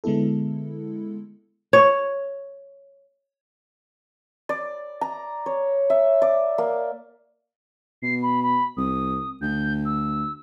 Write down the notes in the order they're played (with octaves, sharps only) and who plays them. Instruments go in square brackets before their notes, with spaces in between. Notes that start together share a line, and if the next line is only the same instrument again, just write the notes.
[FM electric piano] D3 G#3 B3 E4 A4
[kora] C#5
[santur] D5
A#5
C#5
E5
D5
A#3
[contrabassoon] B2 [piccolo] C7
[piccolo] B5
B5
[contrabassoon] C2 [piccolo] D#6
[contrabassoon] D2 [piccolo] G6
[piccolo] E6